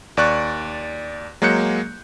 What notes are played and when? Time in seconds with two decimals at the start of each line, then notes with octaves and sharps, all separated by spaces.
0.17 D#2 D5 C#6 F#6
1.42 F#3 G#3 A#3 F#6 G6 C#7